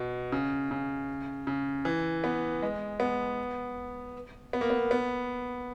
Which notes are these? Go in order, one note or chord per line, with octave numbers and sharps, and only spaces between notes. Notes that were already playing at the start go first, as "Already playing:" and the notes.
Already playing: B2
C#3
C#3
C#3
E3
B3
G#3
B3
B3
A#3
B3
B3